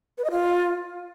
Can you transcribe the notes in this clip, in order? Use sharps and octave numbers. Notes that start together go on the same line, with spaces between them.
B4
D#5
F4